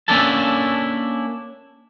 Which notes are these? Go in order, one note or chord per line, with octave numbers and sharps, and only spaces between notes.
A#3 C#4 D4 E4 A4 A5